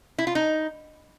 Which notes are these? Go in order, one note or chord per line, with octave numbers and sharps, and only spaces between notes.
E4
F4
D#4